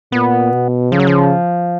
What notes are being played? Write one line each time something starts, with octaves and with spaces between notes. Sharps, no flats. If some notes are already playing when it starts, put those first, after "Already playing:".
A#2 B3
B2
C#3 F3
F#3
F3